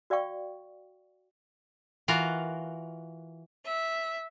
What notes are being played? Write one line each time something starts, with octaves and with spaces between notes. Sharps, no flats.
F#4 D5 F5 G5 C#6
E3 F4 F#4 A#4
E5